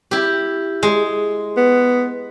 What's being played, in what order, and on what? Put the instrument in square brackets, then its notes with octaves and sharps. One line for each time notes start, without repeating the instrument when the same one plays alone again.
[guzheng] E4 G4
G#3
[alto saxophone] B3